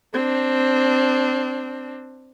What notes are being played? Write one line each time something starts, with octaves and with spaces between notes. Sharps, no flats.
C4 D4